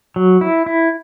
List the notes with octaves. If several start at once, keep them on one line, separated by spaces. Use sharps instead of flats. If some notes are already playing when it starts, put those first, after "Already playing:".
F#3
E4
E4